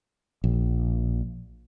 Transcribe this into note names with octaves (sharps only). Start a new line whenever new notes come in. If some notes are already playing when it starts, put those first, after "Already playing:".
A#1